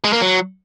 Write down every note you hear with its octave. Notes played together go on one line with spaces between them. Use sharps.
G#3
A#3
F#3